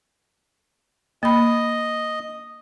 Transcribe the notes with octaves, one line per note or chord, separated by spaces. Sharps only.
A#3 D#5 B5